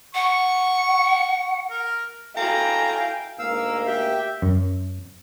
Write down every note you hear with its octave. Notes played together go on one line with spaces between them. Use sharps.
F#5 C#6
A#4
E4 F#4 A4 F5 G5 G#5 A#5
D2 G#2 A#3 F5 E6
G4 E5 G5
F#2